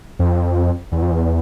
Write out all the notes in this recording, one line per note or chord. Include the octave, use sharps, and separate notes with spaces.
F2
E2
F2
E2